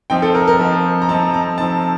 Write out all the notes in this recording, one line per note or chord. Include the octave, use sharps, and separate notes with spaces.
F3 C4 D#4 G5
A4
A#4
A#4
F3 C4 D#4
A#5
F3 C4 D#4 A5
A#5
F3 C4 D#4 A5